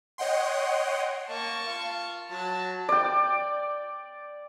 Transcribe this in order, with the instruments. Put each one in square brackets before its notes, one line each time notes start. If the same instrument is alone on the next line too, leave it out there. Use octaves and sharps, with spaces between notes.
[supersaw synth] C#5 D#5 F#5 G5 C6
[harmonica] A#3 [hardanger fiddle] A5 C#6
[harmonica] F4 F5
[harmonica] F#3 [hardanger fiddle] A5
[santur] D5 G5